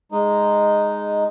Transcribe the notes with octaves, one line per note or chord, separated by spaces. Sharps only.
G#3 D#4